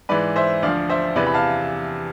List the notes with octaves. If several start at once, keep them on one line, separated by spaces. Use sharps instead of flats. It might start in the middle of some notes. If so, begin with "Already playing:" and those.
G#2 E3 B4 D5
C5 E5
D2 D3 F3 D5 F5
C5 E5
E2 C3 E3 B4 D5
B5
F5 A5